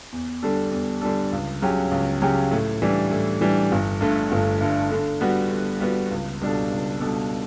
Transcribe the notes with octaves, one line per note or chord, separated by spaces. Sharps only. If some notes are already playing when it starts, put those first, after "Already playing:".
E2
D3 G3 D4 A4
E2
D3 G3 D4 A4
C#2
C#3 F#3 C#4 G4
C#2
C#3 F#3 C#4 G4
A2
E3 G3 D4
A2
E3 G3 D4
G1
G2 D3 A3
G1
G2 D3 A3
D3
G3 B3 F#4
D3
G3 B3 F#4
C#2
B2 G3 D4 A4
C#2
B2 G3 D4 A4